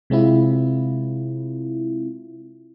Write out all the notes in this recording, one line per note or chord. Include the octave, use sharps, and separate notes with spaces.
C3 G#3 C4 E4 F4